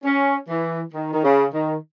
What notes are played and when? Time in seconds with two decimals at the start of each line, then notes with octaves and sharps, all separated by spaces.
0.04 C#4
0.49 E3
0.93 D#3
1.13 D#3
1.23 C#3
1.53 D#3